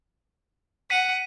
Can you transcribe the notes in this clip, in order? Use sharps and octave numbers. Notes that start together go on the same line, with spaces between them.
F#5 B6 D#7